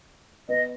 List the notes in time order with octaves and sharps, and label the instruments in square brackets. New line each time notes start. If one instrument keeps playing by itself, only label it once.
[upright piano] B3 [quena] D#5